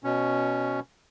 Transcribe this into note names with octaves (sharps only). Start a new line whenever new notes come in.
B2 C#4